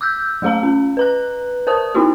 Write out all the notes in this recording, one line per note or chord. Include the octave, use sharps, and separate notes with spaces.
D6 E6 F#6 G6
F#3 A3 G#4 F5 A#5
C#4
B4 A#5 F#6
A#4 C5 A5 D#6
B3 D#4 E4 F#4 G#4